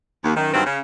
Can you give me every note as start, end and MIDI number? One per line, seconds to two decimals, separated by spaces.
0.24 0.32 39
0.36 0.50 42
0.36 0.50 51
0.53 0.63 43
0.53 0.63 51
0.53 0.63 54
0.53 0.63 60
0.65 0.78 49